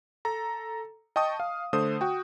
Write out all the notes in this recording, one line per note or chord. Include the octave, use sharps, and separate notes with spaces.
A4 A#5
D#5 G5 A5 C#6 D#6
F5
D3 A3 C5 D#6
F#4 G5